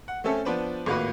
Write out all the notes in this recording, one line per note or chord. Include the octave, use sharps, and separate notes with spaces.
F#5
A3 C4 C#4 A4 E5
F3 B3 D4 B4 C5
G#1 A2 A#3 F4 F#4 B4